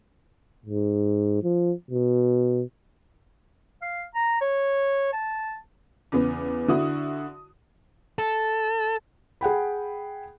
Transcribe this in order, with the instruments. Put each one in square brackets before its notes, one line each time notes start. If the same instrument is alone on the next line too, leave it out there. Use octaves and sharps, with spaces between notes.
[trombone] G#2
F3
B2
[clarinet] F5
A#5
C#5
A5
[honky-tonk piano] E2 C#3 B3
D3 E4 F#4 D#6
[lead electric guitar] A4
[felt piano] G#4 F#5 G5 B5